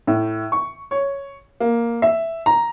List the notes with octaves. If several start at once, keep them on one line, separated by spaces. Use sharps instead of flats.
A2
C#6
C#5
A#3
E5
A#5